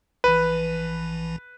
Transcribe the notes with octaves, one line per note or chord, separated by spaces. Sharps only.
A#1 E3 B4